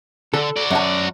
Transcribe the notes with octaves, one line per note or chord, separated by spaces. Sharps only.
D3 A4
F#4 D5
F#2 F#5 A5